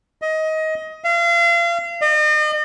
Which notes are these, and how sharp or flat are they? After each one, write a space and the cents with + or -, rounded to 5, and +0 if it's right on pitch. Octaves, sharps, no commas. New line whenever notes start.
D#5 +20
F5 -35
D#5 -40